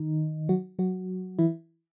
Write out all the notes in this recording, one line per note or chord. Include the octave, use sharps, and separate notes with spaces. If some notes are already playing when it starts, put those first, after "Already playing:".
Already playing: D#3 D#4
F#3 F#4
F#3 F#4
E3 E4